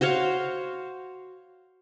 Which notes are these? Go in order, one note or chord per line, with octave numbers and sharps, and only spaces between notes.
F#4 C5 C#5 F5